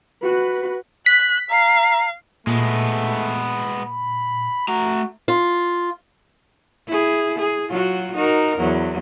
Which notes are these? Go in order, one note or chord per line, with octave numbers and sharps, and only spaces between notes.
F#4 B4
F#6 B6
F5 A#5
A#2 G#3 A3 B3
B5
A3 F#4 A#5
F4
E4 G#4
G#4
F#3 F4 F#4
D#4 F#4 A#4
E2 F#3